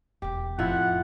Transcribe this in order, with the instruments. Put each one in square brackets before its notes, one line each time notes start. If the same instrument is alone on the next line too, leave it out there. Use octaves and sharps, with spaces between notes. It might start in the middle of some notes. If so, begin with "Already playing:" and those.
[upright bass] E1 B3 [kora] G4
[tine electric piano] F2 A2 [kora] F3 E4 [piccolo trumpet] F#5